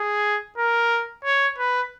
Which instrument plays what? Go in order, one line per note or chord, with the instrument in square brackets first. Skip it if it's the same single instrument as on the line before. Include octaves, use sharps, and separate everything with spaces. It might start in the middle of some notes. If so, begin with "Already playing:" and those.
Already playing: [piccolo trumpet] G#4
A#4
C#5
B4